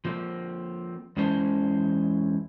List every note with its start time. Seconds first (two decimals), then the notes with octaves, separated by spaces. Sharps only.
0.05 F3 A#3 C4
1.17 E2 E3 G#3 C#4 C5 A5